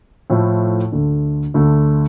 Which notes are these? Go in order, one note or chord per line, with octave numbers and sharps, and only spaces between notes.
A2 F3 A3 E4
D2 D3 A3
D2 D3 A3